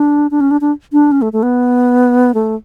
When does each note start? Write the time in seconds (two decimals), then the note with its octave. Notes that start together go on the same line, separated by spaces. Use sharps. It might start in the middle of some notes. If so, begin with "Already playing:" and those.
Already playing: D4
0.31 D4
0.40 C#4
0.51 D4
0.61 D4
0.92 D4
1.12 C#4
1.22 A3
1.33 A3
1.43 B3
2.34 A3